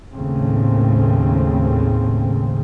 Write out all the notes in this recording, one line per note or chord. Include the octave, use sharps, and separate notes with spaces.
D#2 A2 C#3 C4